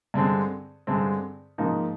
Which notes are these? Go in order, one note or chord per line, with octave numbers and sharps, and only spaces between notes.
G2 D3 G#3 C4
G2 D3 G#3 C4
G#2 F3 A#3 D#4